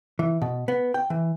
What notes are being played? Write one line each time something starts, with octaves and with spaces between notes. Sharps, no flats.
E3
B2
B3
G5
E3